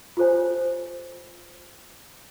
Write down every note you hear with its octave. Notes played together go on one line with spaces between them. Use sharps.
F4 G4 A4 C5 C#5 G#5